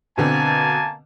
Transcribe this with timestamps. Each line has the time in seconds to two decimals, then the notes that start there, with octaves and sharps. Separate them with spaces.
0.18 B2 D3 A#3 C4 G#5 A5